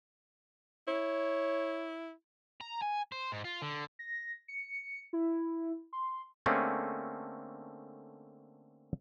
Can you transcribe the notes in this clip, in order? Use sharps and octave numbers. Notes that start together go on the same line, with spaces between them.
E4 C#5
A#5
G#5
C5
G#2
F4
D3
A#6
C#7
E4
C6
D3 A3 A#3 C4 C#4 G#4